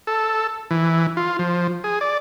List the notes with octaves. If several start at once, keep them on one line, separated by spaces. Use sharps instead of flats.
A4
E3
F4
F3
G#4
D5